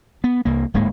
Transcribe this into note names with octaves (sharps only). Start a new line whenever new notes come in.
B3
C2 A#3
D1 G#2 G#3 A#3